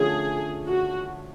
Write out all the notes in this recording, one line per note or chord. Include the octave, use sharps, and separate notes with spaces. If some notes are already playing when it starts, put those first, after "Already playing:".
Already playing: D3 F3 A3 C#4 G#4
F#4